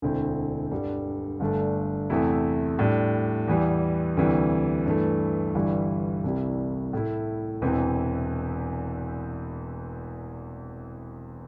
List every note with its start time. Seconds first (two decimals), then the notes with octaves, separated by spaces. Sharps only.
0.02 E1 D2 D3 C4 E4
0.71 G2 D3 G3
1.40 G1 G2 D3 A3 D4
2.10 E2 C3 A3 E4
2.79 A2 G3 D4
3.48 E2 E3 G3
4.17 D2 C3 E3 G3
4.86 G2 E3 A3
5.55 G1 G2 E3 G3 E4
6.24 C2 C3 G3 E4
6.93 A2 A3 E4
7.62 E1 E2 C3 E3 C4